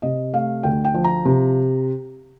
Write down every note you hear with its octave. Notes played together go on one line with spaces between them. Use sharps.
C3 D#5
A3 F5
D2 G5
G5
F3
A#5
C3